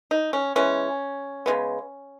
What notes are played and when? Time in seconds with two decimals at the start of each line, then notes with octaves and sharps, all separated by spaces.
0.11 D#4
0.33 C#4
0.56 E3 G#3 B3 C#4
1.46 C#3 E3 G#3 B3